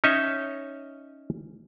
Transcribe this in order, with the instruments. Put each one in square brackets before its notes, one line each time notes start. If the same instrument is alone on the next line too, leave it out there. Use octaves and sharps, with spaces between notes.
[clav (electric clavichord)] C#4 D#4 C#5 D#5 E5